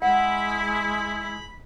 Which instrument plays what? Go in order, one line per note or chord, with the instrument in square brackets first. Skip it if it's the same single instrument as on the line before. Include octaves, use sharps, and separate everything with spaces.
[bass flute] G#3 [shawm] E4 [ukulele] F#5 [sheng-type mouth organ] B5